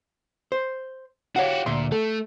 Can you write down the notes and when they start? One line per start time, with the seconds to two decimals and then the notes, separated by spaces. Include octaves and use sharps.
0.52 C5
1.36 F#4 G4 C#5 F5 F#5
1.66 D2 A#2 E5 C6
1.92 A3 A4